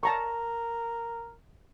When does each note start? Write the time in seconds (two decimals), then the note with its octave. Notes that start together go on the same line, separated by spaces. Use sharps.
0.03 A#4 A5 A#5 C#6